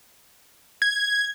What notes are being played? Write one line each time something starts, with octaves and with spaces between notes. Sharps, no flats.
G#6